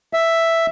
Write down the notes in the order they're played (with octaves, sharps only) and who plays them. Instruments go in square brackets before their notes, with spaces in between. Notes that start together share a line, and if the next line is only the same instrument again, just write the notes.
[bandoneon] E5